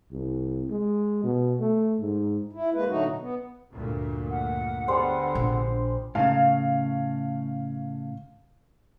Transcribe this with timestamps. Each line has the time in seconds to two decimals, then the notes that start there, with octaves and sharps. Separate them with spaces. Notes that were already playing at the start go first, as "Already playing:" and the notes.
0.12 C2
0.70 G#3
1.24 B2
1.59 A3
2.01 G#2
2.53 E4
2.74 G#3 A#3 B4
2.88 A2 D3 F#3 A3 D#4 F#4
3.06 B2
3.19 B3
3.70 D2 G2 A#2
4.30 F#5
4.88 D3 G3 G#3 B3 C5
5.35 A#1
6.15 A2 C#3 F5